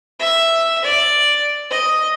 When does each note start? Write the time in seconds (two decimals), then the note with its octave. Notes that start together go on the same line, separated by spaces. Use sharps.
0.19 E5
0.84 D5
1.70 D#5